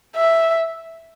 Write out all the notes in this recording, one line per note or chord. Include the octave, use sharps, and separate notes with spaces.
E5